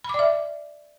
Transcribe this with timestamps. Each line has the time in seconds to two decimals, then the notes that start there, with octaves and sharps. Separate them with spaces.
0.04 B5
0.09 D6
0.14 D5
0.19 E5